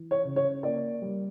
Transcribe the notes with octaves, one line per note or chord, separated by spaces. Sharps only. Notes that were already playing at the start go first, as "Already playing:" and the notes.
Already playing: E3
C#5
C#3
C#5
A#3 D5
G3